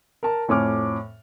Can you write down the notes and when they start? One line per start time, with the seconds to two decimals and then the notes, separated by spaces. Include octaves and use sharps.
0.23 A#4 A5
0.48 F2 A2 C#5 G#5 D6 F6